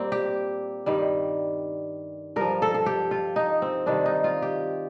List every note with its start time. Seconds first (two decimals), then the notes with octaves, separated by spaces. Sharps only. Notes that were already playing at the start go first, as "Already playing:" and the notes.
Already playing: A#2 G3 A#3 C4
0.12 G4
0.86 G2 D#3 G3
2.36 G2 F3 A#4
2.62 A4
2.74 A4
2.86 G4
3.11 F4
3.36 D#4
3.62 C4
3.86 C3 D#3 G3 D4
4.06 D#4
4.24 F4
4.42 G4